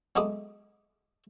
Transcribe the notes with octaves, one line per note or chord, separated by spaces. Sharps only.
F#3 G#3 A3 B3 D6 D#6